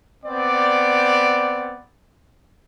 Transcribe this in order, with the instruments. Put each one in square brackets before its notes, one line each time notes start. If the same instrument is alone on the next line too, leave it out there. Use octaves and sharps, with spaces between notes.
[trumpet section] B3 C4 D5